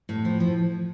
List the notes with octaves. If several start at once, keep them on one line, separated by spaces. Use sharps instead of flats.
A2
F3
F3